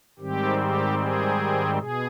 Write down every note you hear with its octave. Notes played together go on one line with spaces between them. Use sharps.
G#2 D#3 G3 C4 G4
G4
G#4
B2 G#4